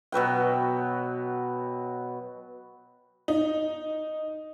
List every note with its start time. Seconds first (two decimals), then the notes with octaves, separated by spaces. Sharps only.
0.12 B2 F#3 B4 G5
3.28 D#4